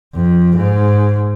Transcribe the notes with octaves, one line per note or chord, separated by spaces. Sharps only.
F2
G#2